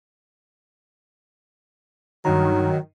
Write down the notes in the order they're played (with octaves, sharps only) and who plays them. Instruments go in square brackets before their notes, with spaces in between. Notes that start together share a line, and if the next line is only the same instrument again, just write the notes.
[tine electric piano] G2 D#4 A#5 [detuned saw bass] D#3 [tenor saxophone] F#3